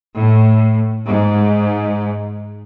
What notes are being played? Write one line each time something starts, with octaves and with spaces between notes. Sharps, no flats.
A2
G#2